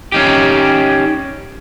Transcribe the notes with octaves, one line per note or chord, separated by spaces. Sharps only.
C#4 D#4 G4